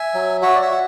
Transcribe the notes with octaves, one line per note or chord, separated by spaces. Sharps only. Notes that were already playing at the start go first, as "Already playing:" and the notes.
Already playing: E5 G#5
F#3
F#4 C#5 E5
D5
C#5 E5
F#4